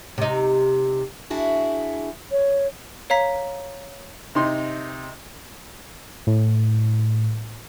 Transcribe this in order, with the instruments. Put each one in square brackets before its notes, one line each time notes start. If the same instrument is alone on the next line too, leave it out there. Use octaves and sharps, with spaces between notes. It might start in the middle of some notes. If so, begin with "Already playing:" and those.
[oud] C3 D#4
[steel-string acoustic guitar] D4 E4 F#4 G#4
[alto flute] C#5
[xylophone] C#5 F5 A#5 B6
[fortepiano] C3 D#4 C6
[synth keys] A2